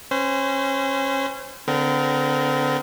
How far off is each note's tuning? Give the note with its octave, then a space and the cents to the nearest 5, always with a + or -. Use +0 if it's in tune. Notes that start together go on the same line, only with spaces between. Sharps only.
C#4 -25 C5 -35
D3 -20 C4 -40 A#4 +0